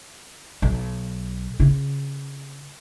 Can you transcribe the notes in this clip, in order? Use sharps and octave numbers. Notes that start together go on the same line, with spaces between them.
B1
C#3 F4